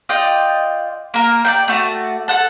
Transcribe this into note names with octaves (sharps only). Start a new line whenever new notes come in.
F4 D5 D#5 G5
A#3 A#4
D5 E5 G5
A3 F#4 D5
A4 F#5 A5